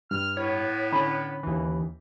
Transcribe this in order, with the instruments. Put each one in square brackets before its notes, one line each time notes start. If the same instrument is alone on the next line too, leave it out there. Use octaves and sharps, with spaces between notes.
[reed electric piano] G2 G3 [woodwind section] F6
[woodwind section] A2 B3 [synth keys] C#5
[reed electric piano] D3 C#4 [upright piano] B5
[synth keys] D#2 E3